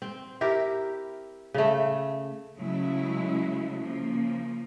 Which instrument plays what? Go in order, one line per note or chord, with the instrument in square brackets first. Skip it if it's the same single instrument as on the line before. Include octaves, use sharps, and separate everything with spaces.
[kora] C4
E4 G4 A#4
C#3 A3
[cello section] C#3 F#3 G#3 A3 E4
C#3 F3 A#3